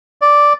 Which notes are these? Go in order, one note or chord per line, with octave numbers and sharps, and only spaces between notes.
D5